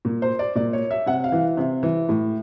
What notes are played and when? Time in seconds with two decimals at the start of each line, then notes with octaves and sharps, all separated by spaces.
0.05 A#2
0.22 C5
0.39 D5
0.55 A#2 D5
0.73 C#5
0.91 E5
1.06 C3 F#5
1.24 F5
1.32 E3
1.57 C3
1.83 E3
2.09 A2